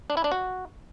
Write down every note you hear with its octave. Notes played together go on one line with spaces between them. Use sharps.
D4
E4
D4
F#4